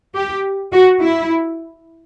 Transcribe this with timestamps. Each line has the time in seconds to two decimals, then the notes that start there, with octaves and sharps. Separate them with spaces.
0.16 G4
0.73 F#4
1.01 E4